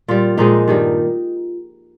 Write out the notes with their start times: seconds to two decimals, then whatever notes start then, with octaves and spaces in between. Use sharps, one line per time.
0.08 A#2 G3 F4
0.38 A#2 F3 G#3 D#4
0.68 G2 D#3 G3